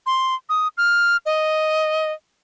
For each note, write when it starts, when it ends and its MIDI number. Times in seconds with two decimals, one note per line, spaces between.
0.06 0.34 84
0.49 0.68 87
0.77 1.17 89
1.26 2.12 75